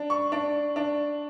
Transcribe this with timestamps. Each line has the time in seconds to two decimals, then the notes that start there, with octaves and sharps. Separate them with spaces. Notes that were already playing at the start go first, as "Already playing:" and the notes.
Already playing: D4
0.10 C#6
0.32 D4
0.76 D4